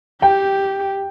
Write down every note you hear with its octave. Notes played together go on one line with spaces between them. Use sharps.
G4 G5